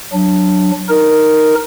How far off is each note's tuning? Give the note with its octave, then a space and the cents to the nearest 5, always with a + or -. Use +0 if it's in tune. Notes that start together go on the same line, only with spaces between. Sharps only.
F#3 +0 D4 +5
D#4 +0 A#4 +0